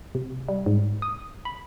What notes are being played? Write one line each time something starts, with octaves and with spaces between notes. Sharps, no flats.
C3
G3
G#2
D#6
B5